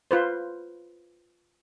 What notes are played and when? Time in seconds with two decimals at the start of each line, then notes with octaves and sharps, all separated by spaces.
0.11 F4 B4 C5